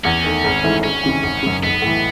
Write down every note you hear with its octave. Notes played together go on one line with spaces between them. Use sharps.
E2 C#4
D#3 A3
G#1
G#2 E3 A3 E4
E1 C#4
D#2 C#3 E3
G#1
F#2 C#3
B1 B3
A2 E3